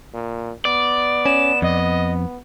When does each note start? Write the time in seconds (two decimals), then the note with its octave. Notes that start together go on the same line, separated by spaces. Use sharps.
0.14 A#2
0.65 B3 D5
1.26 C#4 E7
1.62 F2 D#5